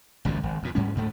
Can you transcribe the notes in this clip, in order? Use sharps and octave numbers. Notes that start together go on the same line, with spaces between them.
G#1 C#2 F#2 A#2
G#1
F2 A#2
G#2 G3 C#4
D2 G#2 A3